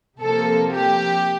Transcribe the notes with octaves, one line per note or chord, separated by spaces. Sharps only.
C3 F3 A#3 A4
G4